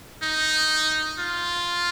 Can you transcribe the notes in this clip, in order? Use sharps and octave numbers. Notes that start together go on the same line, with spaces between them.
D#4
F4